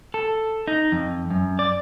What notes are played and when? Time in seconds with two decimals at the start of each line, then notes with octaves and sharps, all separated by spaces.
0.14 A4
0.68 D#4
0.92 F2
1.30 F#2
1.59 D5